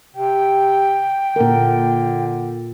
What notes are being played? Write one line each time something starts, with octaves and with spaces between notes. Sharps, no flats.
C3 G5
A#2 D3 A#4